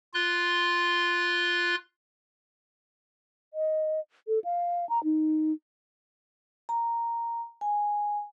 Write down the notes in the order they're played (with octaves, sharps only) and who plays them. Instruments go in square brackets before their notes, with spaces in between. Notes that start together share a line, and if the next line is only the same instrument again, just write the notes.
[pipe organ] F4 C6 F#6
[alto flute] D#5
A4
F5
A#5
D#4
[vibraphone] A#5
G#5